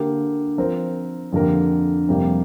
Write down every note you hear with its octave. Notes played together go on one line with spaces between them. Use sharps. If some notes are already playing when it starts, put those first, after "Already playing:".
Already playing: D3 A#3 G4
F3 C4 A#4
F2 D3 A#3 G4 A#4
F2 C3 G3 A#3 G4